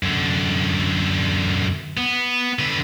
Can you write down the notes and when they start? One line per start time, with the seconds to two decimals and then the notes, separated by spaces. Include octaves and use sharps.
0.03 F#2 D3
1.97 B3
2.59 D3 B4